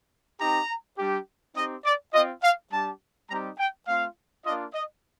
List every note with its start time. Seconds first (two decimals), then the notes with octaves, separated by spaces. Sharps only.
0.39 C4 D#4 G4 A#5
0.98 G3 D4 G4
1.55 C4 D#4 G4 D#5
1.85 D5
2.13 C4 F4 D#5
2.42 F5
2.71 G3 D4 G4 A5
3.29 G3 C4 D#4 G4 A#5
3.58 G5
3.87 A3 C4 F4 F5
4.45 A#3 D4 F4 D#5
4.74 D#5